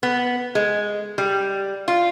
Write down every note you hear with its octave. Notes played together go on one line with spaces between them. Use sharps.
B3
G#3
G3
F4